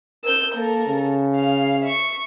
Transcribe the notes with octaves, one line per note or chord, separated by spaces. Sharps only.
A#4 E6 G6
A#3 A4 A#4
C#3
F5
E5 C#6